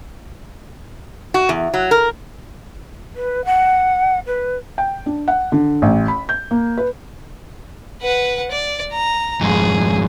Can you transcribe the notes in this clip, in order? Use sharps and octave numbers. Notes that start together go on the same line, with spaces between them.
F#4
E2
F#3
A#4
B4
F#5
B4
G5
D4
F#5
D3
A1
B5
G6
A#3
B4
B4 F#5
D5
A#5
F2 G#2 G#4